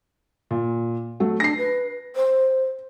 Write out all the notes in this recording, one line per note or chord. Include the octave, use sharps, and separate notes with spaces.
A#2
F#3 A3
D4 A#6 C7
B4
C5